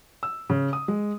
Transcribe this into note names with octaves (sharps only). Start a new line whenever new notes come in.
E6
C#3
D#6
G#3